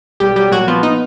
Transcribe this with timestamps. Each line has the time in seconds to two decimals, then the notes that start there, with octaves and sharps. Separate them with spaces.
0.20 B1 G3 G4
0.36 F#3 G3 G4
0.51 A#2 F#3 F#4
0.68 F3 B3 F4
0.83 D#4